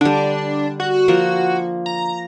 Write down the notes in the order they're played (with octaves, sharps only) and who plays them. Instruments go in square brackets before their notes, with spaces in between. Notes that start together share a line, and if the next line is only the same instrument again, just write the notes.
[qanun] D3 G3 [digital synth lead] D4
[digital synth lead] F#4
[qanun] F3 A#3
[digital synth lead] A#5